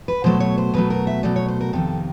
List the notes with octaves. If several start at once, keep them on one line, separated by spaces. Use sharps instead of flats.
B4
B2 F#3 A3 C5
C#5
C5
B2 F#3 A3 B4
A#4
E5
B2 F#3 A3 D5
C#5
C5
A#4
F2 C3 D#3 A4